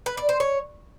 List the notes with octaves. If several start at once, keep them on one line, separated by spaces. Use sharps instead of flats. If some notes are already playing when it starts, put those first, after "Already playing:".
B4
D5
C5
C#5